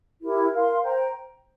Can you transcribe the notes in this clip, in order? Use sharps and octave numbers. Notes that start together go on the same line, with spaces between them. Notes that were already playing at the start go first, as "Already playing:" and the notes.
E4 G4 A#4
A#4 F5 C6
C5 G5 A#5